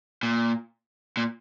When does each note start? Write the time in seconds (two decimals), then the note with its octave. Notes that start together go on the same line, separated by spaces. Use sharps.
0.23 A#2
1.17 A#2